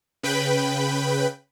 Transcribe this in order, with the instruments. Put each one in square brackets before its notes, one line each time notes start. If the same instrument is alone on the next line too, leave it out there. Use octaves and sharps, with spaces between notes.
[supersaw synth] C#3 B4 G5 B5